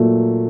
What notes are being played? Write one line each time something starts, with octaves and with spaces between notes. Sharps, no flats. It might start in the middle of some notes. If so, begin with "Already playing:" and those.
Already playing: A#2 F#3 A3